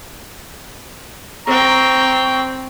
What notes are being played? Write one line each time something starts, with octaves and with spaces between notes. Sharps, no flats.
C4 G5 A#5 C#6